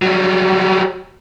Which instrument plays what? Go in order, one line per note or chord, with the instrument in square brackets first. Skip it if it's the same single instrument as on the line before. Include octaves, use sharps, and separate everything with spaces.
[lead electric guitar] F#3 G3